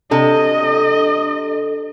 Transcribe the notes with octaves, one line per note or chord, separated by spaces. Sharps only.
C3 D4 A4 D#5